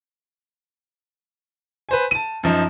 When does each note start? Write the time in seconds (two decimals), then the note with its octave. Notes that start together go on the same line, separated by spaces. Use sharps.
1.89 B4 C5 G#5
2.11 A5 D#7
2.43 F#2 F3 D#4